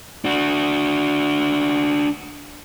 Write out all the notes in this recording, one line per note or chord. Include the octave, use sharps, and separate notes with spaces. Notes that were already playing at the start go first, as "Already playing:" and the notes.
D4 F#4